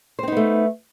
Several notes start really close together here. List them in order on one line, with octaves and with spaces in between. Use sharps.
C5 C4 D#4 B3 A3